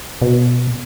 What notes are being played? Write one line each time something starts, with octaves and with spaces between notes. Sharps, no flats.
B2